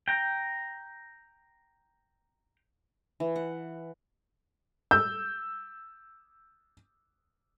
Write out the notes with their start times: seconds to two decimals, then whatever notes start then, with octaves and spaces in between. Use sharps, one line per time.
0.08 G5 A#5
3.20 E3
3.36 F#5
4.91 E6 G6